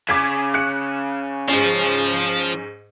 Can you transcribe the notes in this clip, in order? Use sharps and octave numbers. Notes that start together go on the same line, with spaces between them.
C#3 D6 G#6 B6
F#6 C#7
G#2 F3 C#4